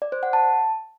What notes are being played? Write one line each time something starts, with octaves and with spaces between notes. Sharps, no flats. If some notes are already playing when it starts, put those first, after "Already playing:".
D5
C5
F#5
A5